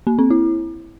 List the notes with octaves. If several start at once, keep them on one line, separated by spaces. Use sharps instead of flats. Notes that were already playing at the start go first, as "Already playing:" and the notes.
A#3
C4
E4